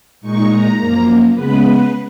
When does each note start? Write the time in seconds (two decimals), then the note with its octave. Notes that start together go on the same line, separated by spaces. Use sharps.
0.21 A#2 G#3 D#4 C#6
0.49 A#5
0.77 F#2 F3 A#3 A#5
1.33 C#3 G#3 B3 B4
1.62 B4